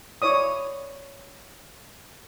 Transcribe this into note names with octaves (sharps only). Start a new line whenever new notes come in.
E4 C#5 D5 D#6